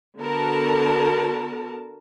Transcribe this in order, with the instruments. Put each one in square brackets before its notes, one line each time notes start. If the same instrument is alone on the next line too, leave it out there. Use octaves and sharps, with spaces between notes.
[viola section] D3 B3 F#4 A#4 A5